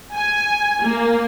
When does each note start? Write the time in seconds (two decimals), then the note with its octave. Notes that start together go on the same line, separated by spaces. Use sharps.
0.13 G#5
0.82 A#3